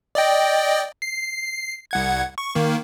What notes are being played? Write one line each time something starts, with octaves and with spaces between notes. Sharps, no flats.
D5 D#5 G5
C7
C2 F#5 G#6
C#6
D#3 A#3